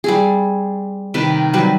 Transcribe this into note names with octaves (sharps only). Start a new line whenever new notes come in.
G3 C4 G#4
C3 D#3 B4 A5
F#3 G3 B4